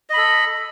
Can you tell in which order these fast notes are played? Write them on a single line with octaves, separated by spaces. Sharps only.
D#5 B5 A4